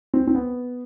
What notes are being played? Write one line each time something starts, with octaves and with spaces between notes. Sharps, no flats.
C4
C4
B3